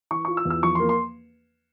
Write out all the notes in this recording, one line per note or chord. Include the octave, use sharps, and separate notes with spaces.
E3 C#6
F4 C#6
E6
E2
E6
F3 C#6
A#3 C6
C6